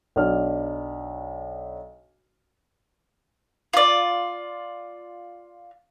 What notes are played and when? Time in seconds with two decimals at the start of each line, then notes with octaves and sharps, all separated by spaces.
0.16 B1 D4 F6
3.73 F4 D5